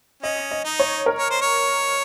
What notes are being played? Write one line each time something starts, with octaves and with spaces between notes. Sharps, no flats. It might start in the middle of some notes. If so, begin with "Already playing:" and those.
C#4 D#5
D#5
D#4
C#5
A#4
C#5
C5
C#5